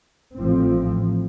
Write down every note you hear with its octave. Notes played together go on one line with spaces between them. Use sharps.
A1 A2 F3 C4